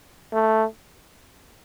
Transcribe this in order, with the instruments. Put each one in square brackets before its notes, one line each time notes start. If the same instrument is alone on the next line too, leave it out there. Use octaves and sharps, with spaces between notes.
[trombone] A3